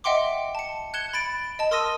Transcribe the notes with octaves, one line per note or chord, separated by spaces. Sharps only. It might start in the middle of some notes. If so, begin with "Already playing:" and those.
D#5 E5 F#5 G5 C6 D6
A5 C#7
F#6 G#6 C#7 E7 G7
B5 A6 D7
D#5 A5
A#4 C6 D#6 E6 A#6 D#7